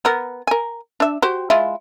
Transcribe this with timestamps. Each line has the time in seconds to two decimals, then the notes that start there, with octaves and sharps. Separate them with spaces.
0.05 B3 A#4
0.47 A#4 G#5
1.00 D4 E5
1.22 F#4 G4 C5
1.50 G#3 E4 F4